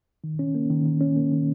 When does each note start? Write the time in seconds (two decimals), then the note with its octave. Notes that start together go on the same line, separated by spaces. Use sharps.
0.24 D#3
0.39 C#4
0.55 A#3
0.70 D#3
0.86 D#3
1.01 C#4
1.16 A#3
1.32 D#3